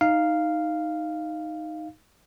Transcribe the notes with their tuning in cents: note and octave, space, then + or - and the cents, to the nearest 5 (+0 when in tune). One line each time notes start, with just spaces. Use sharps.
D#4 +0 F5 -5